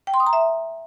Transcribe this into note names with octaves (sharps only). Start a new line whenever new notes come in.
G5
C6
D#6
A#5
E5